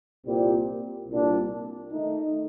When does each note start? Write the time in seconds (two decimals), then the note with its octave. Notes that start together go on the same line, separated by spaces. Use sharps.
0.25 C2 A#2 G3 C4 G4
1.08 C2 A#2 G3 D4
1.93 D#3 A3 D#4